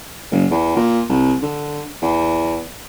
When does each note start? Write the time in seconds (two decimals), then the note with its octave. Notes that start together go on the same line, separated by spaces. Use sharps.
0.31 F#1
0.51 E2
0.76 A#2
1.09 C2
1.42 D3
2.02 E2